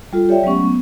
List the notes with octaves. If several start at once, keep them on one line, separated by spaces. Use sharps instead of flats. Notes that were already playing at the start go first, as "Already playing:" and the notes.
G3 F4 A4
G4 C#5 D5 E5 G5
F#3 G#3 A3 B3 C#4 C#6
B3